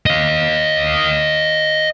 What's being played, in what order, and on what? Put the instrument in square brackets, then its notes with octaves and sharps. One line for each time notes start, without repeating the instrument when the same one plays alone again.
[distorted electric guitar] D#5 F5